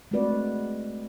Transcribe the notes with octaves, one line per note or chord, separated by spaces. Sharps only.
G#3 A3 C4 F#4 B4 D5